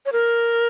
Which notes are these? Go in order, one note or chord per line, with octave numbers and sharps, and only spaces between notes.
C#5
A#4